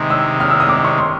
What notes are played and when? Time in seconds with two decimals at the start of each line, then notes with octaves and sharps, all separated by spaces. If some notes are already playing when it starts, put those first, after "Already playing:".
Already playing: C3 D#3 G#3
0.10 E6
0.40 F6
0.50 E6
0.60 D#6
0.69 D6
0.85 C#6
0.98 C6